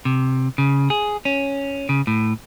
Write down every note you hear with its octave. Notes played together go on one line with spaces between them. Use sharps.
C3
C#3
G#4
C#4
C#3
A2